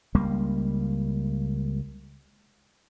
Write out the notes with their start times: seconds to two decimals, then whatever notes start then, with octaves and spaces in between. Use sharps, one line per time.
0.15 C#2 G3 A#3